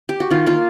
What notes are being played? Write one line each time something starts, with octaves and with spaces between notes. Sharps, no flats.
G4
F#4
D#3 F4
A#3 F4